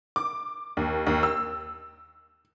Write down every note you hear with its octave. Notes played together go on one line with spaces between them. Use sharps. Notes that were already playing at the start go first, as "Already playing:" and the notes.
D6
D#2
D#2
E6